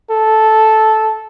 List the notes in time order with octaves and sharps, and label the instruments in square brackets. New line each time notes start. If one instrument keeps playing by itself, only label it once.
[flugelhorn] A4